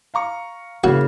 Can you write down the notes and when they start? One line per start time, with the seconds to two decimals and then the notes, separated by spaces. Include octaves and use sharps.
0.14 F5 A#5 C#6
0.84 C#3 A#3 E4 F#4